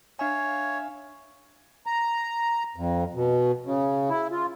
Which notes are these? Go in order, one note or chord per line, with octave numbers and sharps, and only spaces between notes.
D4 C#5 E5 F5 G#5
A#5
F2
B2
C#3
E4
F4